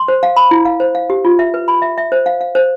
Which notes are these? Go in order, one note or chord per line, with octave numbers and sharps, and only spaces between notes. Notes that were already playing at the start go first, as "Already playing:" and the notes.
Already playing: C6
C5
F5
B5
E4
F5
C5
F5
G4
F4
E5
B4
B5
E5
E5
C5
F5
F5
C5